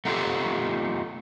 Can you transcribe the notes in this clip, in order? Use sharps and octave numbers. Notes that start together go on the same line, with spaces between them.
A3 B3 D#4 F4 G4 A4